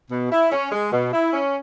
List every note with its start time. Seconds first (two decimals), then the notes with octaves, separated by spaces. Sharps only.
0.10 B2
0.31 E4
0.51 C#4
0.71 G#3
0.91 B2
1.12 E4
1.32 C#4